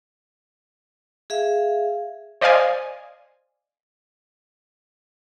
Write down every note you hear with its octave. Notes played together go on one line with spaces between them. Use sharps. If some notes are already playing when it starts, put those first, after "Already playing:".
G#4 E5 F5
C5 D5 D#5 F5 G#5